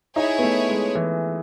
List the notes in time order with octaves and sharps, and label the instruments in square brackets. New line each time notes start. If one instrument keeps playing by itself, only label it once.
[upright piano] D#4 [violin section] E4 G#4 C#5
[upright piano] B3
A3
G#3
E3